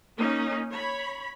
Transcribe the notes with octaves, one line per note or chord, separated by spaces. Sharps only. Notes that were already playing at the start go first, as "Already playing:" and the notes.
A#3 C#4 D#4
C#5 B5